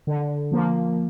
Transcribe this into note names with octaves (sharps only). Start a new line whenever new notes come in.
D3
F3 A#3